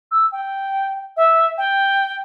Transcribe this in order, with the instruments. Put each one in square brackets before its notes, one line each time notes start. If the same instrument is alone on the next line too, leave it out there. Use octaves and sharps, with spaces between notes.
[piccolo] E6
G5
E5
G5